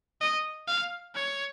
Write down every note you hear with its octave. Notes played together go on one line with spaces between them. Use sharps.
D#5
F5
C#5